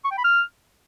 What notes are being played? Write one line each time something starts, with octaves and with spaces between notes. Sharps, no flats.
C#6
G5
B5
F6